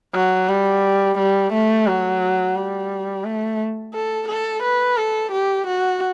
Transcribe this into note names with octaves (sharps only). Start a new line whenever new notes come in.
F#3
G3
G3
A3
F#3
G3
A3
A4
A4
B4
A4
G4
F#4